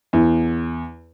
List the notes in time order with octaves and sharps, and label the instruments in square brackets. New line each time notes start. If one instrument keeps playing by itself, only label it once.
[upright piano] E2